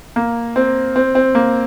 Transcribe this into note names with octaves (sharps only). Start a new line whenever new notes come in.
A#3
C4
C4
C4
A#3